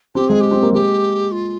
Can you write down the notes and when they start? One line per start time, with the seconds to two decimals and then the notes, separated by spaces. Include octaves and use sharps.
0.15 C4 G4
0.28 G#3 G#4
0.40 G4
0.51 C4
0.63 A#3
0.73 G#3 G4
1.31 F4